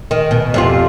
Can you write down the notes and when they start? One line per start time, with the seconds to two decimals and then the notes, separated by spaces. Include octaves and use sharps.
0.11 D#3
0.31 B2
0.54 F2 C3 F4